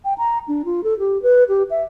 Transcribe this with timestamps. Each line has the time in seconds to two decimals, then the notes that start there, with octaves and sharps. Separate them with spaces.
0.05 G5
0.18 A#5
0.48 D4
0.65 F4
0.84 A4
0.99 G4
1.23 B4
1.49 G4
1.70 E5